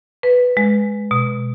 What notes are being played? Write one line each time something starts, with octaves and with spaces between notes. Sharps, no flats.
B4
G#3
B2